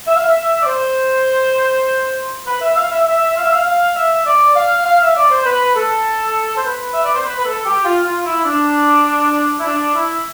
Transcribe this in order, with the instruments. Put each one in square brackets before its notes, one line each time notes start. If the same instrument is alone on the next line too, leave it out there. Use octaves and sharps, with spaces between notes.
[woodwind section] E5
F5
E5
D5
C5
B4
E5
F5
E5
E5
F5
E5
F5
F5
E5
D5
F5
F5
E5
D5
C5
B4
A4
C5
B4
E5
D5
C5
B4
B4
A4
G4
F4
F4
E4
D4
E4
D4
E4